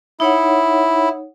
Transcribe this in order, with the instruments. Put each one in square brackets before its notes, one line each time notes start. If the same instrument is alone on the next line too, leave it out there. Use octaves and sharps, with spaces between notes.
[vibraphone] D#4 C#5 F#5 [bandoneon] E4